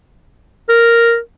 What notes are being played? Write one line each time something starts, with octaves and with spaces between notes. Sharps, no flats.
A#4